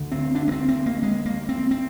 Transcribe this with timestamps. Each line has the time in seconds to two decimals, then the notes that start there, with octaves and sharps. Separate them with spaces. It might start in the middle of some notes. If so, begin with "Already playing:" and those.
Already playing: D2 D3
0.12 C4
0.35 D4
0.48 A#3
0.52 C4
0.68 C4
0.86 A#3
1.03 G#3
1.26 A#3
1.49 C4
1.71 C4